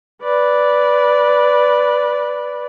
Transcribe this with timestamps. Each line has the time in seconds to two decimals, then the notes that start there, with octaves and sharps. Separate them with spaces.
0.23 B4 D5